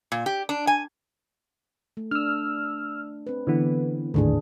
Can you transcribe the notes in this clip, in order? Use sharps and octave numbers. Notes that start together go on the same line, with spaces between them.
A#2
G4
D4
G#5
A3
D4 E6 F6
C4 B4
D3 E3 B3
G#1 D#2 A2 D3 D4 G#4